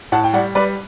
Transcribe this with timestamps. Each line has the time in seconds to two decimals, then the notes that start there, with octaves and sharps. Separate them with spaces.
0.12 A2 F#5 A5
0.24 G5
0.33 G3 D5 F#5
0.55 G3 B4 D5